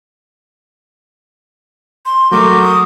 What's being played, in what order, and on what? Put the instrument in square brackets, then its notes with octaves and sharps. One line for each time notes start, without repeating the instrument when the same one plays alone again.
[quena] C6
[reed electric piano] F#3 A3 [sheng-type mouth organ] F#4 A#4 G6 [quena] D6
[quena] D#6